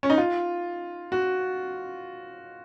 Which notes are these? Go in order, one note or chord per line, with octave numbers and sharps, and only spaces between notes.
C#4
D#4
F4
F#4